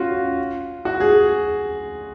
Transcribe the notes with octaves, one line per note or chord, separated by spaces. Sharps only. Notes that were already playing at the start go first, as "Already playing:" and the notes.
Already playing: C#4 F4 F#4
F#4
G#4